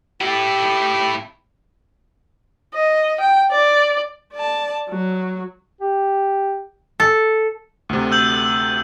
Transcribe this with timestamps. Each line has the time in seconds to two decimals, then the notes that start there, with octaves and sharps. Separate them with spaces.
0.21 A3 E4 G4
2.74 D#5
3.20 G5
3.51 D5
4.33 D5 A5
4.90 F#3
5.81 G4
7.00 A4
7.89 D2 C3
8.12 E6 G6 F#7